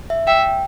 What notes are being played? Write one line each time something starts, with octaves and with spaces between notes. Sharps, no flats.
E5
E5 G5